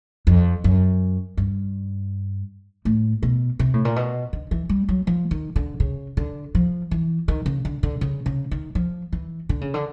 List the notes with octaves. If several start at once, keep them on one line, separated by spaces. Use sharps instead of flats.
F2
F#2
G2
A2
B2
C3
A2
A#2
B2
D3
E3
G3
F#3
F3
D#3
D3
C#3
D3
F3
E3
D#3
C#3
D3
D3
C#3
C#3
D#3
F3
E3
D3
C#3
D3